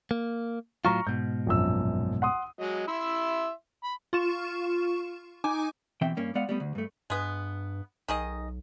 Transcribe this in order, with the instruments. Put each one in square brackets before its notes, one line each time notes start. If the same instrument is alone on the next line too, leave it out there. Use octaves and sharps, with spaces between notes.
[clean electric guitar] A#3
[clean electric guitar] A2 F#3 F4 [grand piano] A#5 C#6 F6
[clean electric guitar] G#2 B2 [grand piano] G6
[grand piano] A#1 F#2 E6
F#5 C6 D#6
[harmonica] F#3 G#3 D#5
E4 E5 C6
B5
[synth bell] F4 C#6 E7
D#4 G#5 D6
[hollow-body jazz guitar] B2 E3 C4 E5 G5
G2 A#3 C#4
G#3 B3 D5 F5 F#5
G3 A3 B3
D2
G2 A3
[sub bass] G2 [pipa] G#3 B3
[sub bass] B1 [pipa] D#3 G#4 D#5